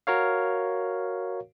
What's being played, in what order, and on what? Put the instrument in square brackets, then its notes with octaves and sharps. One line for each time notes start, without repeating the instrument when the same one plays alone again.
[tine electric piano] F#4 A#4 C#5 F5